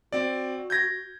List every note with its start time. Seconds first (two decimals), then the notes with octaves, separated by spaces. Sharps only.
0.12 C4 F#4 D5
0.70 G6 G#6 A#6